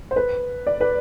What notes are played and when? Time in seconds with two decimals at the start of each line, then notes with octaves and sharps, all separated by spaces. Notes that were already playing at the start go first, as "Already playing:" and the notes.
0.11 C5
0.16 B4
0.67 D5
0.81 B4